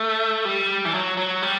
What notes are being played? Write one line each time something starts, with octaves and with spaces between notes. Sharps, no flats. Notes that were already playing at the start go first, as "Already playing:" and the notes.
Already playing: A3
G3
E3
F#3
F#3
G3